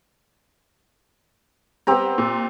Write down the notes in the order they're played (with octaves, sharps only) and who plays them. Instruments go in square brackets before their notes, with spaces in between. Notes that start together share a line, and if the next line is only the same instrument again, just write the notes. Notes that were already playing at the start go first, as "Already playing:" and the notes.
[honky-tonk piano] G3 B3 [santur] C4 G4 A#5
[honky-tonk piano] A#2